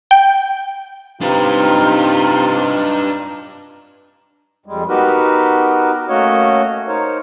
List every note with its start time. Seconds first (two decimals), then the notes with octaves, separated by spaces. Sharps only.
0.11 G5
1.22 C3 D4 D#4 F4 B4
4.66 F2 G3 G#3
4.88 B3 D#4 F#4 G4 A#4 B4
6.09 A3 A#3 C#4 F#4 C#5 D#5
6.88 D#4 A#4 C5 C#5